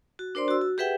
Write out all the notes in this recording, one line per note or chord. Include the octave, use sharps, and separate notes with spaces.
F#4
D4 A#4 C5 D5 C6
F#4 E6
F#4
G4 G#4 B4 E5 F#5 G5